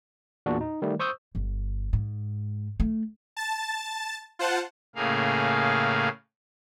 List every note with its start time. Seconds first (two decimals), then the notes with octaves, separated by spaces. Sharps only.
0.46 E2 A#2 D4 F#4
0.61 D#4
0.82 D#3 G3 A3
0.99 C5 C#6 D#6 E6 G6
1.35 G1
1.93 G#2
2.80 A3
3.37 A5 A6
4.39 F4 C5 F#5 A5
4.96 A2 C#3 A#3 G#4 F5